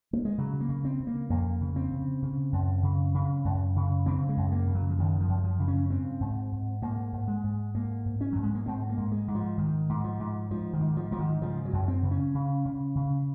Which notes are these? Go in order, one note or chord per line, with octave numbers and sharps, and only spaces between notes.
A#3
G#3
C#3 F#3
A#3
C#3
C4
C#3
A#3
F2 A#3
C#3
C4
C#3
C#3
F#2
C#3
C#3
F#2
C#3
C#3 C4
G#3
F#2
A#3
C#3
F#3
F3
F#2 D#3
F3
F#2
F3
C#3
C#4
G#2 C4
G#2
G#2
G#2 A#3
G#2
G#3
G#2
G#2 A#3
G#2
C#4
G#2 F#3
G#3
A#3
G#2 C4
A#3
G#2
G#3
G#2
F3
G#2 D#3
G#2
F3
G#2
G#2 F3
D#3
G#2
F3
G#2 F3
D#3
C#3 F3
F#3
F#2
C4
C#3
C#4
C#3
C#3
C#3